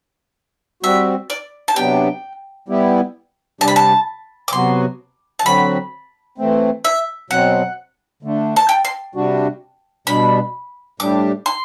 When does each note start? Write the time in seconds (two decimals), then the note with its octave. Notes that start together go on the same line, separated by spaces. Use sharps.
0.83 G3 C4 F#4 E5
1.30 D5
1.68 A5
1.76 C3 F#3 B3 D4 G4 G5
2.68 G3 B3 E4 G4
3.61 C3 G3 D4 G4 A5
3.68 B5
3.76 A5
4.48 D6
4.53 C3 F#3 B3 F#4 C6
5.39 A5
5.45 D3 F#3 C4 F#4 B5
6.38 E3 A3 C4
6.85 E5
7.30 B2 F#3 C4 F#5
8.23 D3 A3 D4
8.56 A5
8.69 G5
8.85 C6
9.15 C3 G3 D4 F#4
10.07 B2 G3 D4 B5
11.00 A2 G3 D4 G4 D6
11.46 C6